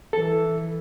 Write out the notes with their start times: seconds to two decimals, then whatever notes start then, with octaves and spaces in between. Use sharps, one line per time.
0.13 E3 A4